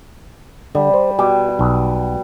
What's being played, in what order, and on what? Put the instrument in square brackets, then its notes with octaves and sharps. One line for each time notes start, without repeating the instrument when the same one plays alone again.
[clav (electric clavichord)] D3 [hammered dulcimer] G3
[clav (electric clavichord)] C5
[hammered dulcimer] B2 [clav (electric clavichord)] G4
[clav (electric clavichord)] B1